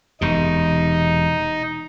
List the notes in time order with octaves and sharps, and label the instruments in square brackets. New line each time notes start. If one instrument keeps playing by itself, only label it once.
[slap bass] E1 C3 [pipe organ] D#4